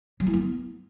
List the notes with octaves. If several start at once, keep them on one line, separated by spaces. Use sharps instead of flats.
F#3
E4
B3